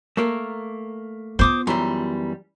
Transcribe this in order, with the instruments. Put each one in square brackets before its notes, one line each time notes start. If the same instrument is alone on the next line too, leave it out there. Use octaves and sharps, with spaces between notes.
[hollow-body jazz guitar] A3 A#3 A#4
[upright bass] B3 F4 [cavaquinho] C5 D6 D#6
[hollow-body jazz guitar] F#2 E3 G3 [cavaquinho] A#5 C6